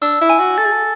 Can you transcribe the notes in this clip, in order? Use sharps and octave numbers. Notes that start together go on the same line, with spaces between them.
D4 E6
E4
G#5
F#4
A4 A6
G#4
A4